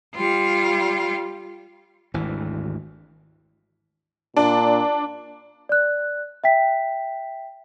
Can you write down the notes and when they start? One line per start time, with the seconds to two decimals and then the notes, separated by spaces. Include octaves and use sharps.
0.15 G3 F4
2.14 G#1 D2 E3
4.36 A#2 D4
5.69 D5 F#6
6.44 E5 G5 B6